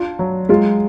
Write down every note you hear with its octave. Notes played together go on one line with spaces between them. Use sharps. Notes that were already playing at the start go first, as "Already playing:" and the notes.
Already playing: D4 F4
F#3
G#3 F4